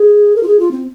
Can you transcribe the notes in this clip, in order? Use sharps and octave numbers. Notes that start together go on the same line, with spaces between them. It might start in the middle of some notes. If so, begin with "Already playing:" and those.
Already playing: G#4
A#4
F4
G#4
F4
C4